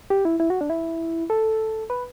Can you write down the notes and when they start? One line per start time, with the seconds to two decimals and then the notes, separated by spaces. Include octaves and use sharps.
0.10 G4
0.25 E4
0.40 E4
0.50 F#4
0.61 D4
0.70 E4
1.30 A4
1.90 B4